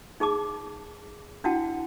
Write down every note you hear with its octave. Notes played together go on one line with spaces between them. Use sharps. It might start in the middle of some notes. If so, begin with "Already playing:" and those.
D#4 G#4 A5 D6
D4 E4 F#4 F#5 G5 A5